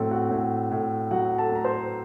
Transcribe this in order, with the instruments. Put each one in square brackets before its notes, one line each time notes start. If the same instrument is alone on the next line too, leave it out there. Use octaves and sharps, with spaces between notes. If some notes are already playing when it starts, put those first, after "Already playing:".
Already playing: [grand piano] A2 F#3 C4 A4
F#4 F#5
A2
A2
F#3 F#4 F#5
A4 A5
A3 A#5
C5 C6